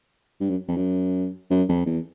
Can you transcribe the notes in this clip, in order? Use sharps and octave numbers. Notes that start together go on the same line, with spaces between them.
G2
F#2
F2
F#2
F#2
F2
E2